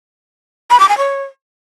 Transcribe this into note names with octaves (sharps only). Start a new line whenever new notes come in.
B5
D6
G#5
C#5